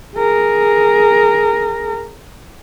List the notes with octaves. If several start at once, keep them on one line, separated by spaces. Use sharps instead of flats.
G#4 A#4